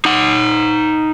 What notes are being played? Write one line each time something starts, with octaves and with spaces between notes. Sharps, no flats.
D#4 F#5